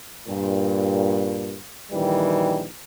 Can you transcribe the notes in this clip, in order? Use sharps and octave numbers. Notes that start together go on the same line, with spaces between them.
G2 A#2
A#1 D#3 E3 G3